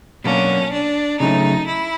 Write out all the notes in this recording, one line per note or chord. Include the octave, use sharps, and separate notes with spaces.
B2 F#3 A#3 C#4 D4
D4
C#3 F#3 A3 D#4
E4